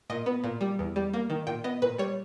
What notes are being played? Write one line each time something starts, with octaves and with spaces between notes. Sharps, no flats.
A#2 D#5
B3
A#2
G3
E2
G3
A#3
D#3
A#2 G5
B3 D#5
A#2 B4
G3 C#5